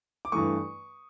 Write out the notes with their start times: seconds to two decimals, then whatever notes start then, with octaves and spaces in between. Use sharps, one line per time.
0.25 D6
0.32 G2 E3 A3 C#6 D#6